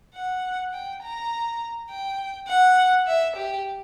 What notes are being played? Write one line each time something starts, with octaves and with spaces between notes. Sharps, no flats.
F#5
G5
A#5
G5
F#5
E5
G4